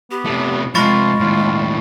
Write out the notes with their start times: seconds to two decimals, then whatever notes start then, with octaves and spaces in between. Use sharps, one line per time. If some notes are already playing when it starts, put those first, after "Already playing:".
0.11 B3 G4
0.25 C3 A3
0.75 C3 F3 G#3 F4 B5 C#6 A6
1.20 D#2 A2 F4